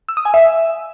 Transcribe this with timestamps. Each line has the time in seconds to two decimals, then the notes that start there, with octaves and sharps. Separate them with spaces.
0.09 E6
0.17 D#6
0.25 G#5
0.34 E5